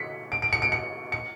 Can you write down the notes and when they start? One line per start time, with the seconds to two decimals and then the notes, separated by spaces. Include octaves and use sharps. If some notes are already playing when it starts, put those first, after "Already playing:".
Already playing: B6 C#7
0.32 D7
0.42 D7
0.53 C#7
0.62 D7
0.72 C#7
1.12 C#7